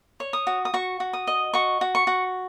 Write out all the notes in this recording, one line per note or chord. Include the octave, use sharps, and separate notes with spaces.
C#5
D#6
F#4
D#6
F#4 C#6
F#4
D#6
D#5
F#4 C#6
F#4
C#6
F#4